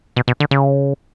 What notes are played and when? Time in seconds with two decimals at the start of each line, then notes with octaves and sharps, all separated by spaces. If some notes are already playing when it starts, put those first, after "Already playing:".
0.16 B2
0.28 B2
0.40 D3
0.51 C#3